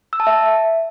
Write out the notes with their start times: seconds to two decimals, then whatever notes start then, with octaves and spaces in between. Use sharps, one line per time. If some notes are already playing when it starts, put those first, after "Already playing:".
0.13 E6
0.20 A5
0.27 E5